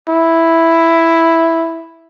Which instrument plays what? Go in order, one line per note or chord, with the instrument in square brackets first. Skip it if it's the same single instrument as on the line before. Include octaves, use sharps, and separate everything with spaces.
[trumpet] E4